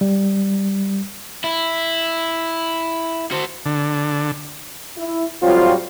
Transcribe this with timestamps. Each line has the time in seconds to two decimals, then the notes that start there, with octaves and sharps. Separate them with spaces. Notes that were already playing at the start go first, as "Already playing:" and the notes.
0.01 G3
1.44 E4
3.32 F#4 C5
3.65 D3
4.98 E4
5.43 A2 F#3 G3 C4 F4